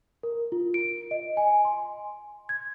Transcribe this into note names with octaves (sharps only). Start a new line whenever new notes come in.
A#4
F4
D7
D#5
G#5
C6
G#6